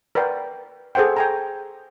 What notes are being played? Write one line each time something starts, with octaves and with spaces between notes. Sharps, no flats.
A#4 B4 D5 F#5 G5
G#4 A4 C5 F#5 G5
G5 G#5 A#5